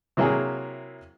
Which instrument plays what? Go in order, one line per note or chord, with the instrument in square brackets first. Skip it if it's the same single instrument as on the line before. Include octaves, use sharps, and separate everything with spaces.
[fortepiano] C3 F#3 A#3 E4 G#4